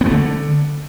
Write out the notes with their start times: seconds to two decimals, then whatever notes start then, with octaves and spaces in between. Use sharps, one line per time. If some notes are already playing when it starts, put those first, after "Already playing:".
0.01 B3
0.06 A3
0.11 D3